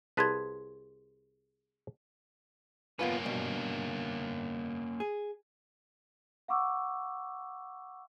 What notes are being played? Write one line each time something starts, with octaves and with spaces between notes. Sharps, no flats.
C2 G#4 B4 A5 C6 G#6
A#3 B3 C#4 F4 B4
G2 B2
G#4
F5 F#5 B5 C#6 D6 E6